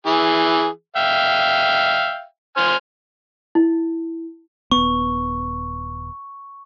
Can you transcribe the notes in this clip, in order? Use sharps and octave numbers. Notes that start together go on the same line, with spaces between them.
E3 G#4
E5 F5 G5
C5 G#5 F6
E4
D#1 B3 C#6